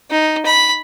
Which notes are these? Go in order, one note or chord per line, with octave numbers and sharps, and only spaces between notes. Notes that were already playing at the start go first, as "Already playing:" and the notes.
D#4
B5